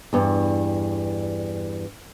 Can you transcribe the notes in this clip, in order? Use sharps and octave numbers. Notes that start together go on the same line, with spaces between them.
E2 G2